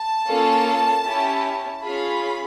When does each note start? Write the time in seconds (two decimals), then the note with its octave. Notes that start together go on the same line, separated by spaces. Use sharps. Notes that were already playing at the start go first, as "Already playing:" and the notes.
Already playing: A5
0.27 A#3 C#4 F4 A4
1.05 C#4 E4 G4
1.83 C#4 F4 G#4 B5